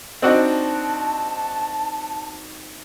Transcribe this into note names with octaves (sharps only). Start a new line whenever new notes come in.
C4 D4 D#4 F#4 A5